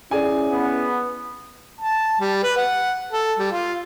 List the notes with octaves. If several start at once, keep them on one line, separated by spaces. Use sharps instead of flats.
C#4 E4 G#4 D5 G#5
B3
A5
G3
B4
F#5
A4
G3
F4